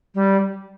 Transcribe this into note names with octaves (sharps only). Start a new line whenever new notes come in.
G3